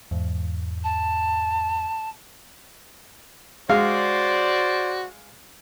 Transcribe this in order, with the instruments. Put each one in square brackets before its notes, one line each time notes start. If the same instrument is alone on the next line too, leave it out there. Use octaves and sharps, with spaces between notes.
[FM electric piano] E2 G#2
[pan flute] A5
[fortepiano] G#3 F5 [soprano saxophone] F#4 [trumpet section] C5 D5